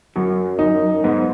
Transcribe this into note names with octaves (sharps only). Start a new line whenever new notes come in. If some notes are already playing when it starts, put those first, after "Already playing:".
F#2 F#3
D#4
G#2 B3